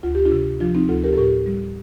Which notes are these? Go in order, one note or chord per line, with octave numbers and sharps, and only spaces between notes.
D2 F4
G4
D4 F4
C3
F3 D4 F4
C4 D#4
D2 F4 A4
G4 A#4
A4
A2 G4 A#4
G3